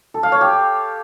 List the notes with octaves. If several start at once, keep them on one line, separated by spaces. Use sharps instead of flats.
A4
F5
C#5
G4